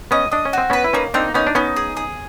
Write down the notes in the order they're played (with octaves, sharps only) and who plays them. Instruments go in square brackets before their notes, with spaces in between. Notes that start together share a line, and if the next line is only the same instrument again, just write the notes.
[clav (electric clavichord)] B3 C#4 [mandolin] D#5
[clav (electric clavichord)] D4 [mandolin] D#5
[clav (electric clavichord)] C#4
[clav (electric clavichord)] C4 [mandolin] F#4
[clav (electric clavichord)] B3 C#4 [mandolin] B4
[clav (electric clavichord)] E4
[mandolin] A#3 [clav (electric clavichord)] C#4 D#4
[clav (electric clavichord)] C4 D4 [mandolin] D#4
[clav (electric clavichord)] B3 C#4 [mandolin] D#4
[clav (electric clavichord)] D4
[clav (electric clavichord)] B3 C#4 [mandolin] D#4
[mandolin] G#4
G#4